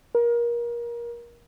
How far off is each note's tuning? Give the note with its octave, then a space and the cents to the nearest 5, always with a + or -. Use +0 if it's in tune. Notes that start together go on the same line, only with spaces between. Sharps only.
A#4 +25